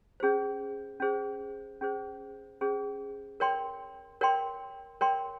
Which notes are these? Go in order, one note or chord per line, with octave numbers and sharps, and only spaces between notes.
C#4 G#4 C5
C#4 G#4 C5
C#4 G#4 C5
C#4 G#4 C5
A#4 C#5 G5 C6
A#4 C#5 G5 C6
A#4 C#5 G5 C6